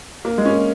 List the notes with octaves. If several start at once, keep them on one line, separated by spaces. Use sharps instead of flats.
A#3
G#3
C#4
A#3